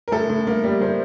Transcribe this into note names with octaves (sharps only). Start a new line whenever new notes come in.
A#4
A2 A4
A2
A#3
G3
A2 C5